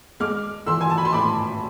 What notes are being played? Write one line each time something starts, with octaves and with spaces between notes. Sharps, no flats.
G#3 D6 F6
E3 C6 E6
G#5
A5
B5
C6
A2 B5 D6